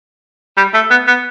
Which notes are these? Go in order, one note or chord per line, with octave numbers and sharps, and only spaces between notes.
G3
A3
B3
B3